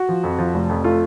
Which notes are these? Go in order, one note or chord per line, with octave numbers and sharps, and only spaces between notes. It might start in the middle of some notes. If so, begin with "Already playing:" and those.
Already playing: F#4
F3
F2
F3
F1
F2
A3 F4